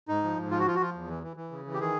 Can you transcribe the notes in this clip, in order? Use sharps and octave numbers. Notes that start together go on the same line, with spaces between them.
G#2 D#4
F3
G#2
F3 F4
F#4
F3 F4
F#4
F3 F4
E2
E3
E3
E3
C#3
E3
G4
D#3 G#4